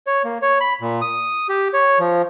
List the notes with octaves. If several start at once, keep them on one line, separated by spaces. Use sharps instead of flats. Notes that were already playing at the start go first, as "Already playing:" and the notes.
C#5
A#3
C#5
B5
A#2
D#6
G4
C#5
F3